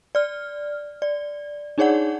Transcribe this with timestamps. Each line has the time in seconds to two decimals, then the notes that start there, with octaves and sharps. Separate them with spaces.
0.15 D5 F6
1.02 D5
1.78 D4 D#4 G#4 C#5 D5 F#5